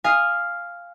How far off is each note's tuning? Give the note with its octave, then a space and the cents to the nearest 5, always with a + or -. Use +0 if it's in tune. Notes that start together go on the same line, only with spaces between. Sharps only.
F5 +0 G#5 -15 D#6 +0